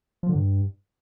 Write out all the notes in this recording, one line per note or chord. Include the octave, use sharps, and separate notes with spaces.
F3
D3
G2